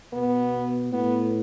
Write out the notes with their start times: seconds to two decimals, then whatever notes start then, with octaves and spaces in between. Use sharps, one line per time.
0.13 B2 B3
0.93 A2 B3